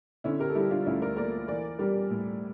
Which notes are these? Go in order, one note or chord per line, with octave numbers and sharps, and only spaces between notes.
D3 C#4 E4
G4 A#4
A4
G3 E4 G4
D4 F4
D2 C#4 E4
A#4 D5
A#3 A#4 D5
E3 A#4 D5
G3 G4 A#4
A2